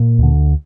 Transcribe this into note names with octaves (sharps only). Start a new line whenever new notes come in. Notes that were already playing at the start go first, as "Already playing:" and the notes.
Already playing: A#2 A#3
D2 D3